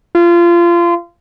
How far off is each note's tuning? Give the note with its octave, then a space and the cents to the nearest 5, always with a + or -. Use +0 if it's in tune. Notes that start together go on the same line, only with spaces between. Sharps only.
F4 -25